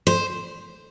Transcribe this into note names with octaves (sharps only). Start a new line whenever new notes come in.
C5